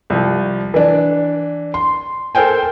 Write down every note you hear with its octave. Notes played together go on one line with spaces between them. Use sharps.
C2 F3
E3 D4
C6
A4 A#4 C5 G5 G#5